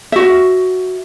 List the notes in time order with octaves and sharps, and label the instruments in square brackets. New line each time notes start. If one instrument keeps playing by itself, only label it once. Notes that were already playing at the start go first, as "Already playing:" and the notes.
[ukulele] F#4 E5